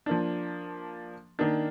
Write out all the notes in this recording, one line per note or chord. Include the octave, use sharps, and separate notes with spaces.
F3 A#3 D4
D#3 A#3 D4